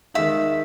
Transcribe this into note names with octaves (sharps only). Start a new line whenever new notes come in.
D#3 G#3 D#4 E5